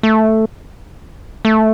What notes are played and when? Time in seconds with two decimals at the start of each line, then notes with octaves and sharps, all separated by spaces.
0.03 A3
1.45 A3